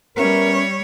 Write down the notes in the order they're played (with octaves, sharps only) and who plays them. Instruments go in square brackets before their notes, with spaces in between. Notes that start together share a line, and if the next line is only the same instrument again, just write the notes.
[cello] G3 C#5 [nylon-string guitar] B3 C#4 E5 [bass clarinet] A#4